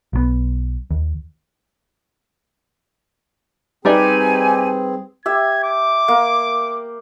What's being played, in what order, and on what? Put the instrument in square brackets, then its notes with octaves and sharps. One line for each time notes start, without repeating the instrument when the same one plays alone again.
[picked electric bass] B1 E3 B3
D#2
[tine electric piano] G3 B4 [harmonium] C4 G#4 [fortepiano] D#4 G4 D5 [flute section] G#5
[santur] G4 E5 [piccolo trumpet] G#6
[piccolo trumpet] D6
[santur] A#3